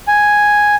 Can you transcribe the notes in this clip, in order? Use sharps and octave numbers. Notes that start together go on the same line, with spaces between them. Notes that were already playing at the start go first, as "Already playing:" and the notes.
G#5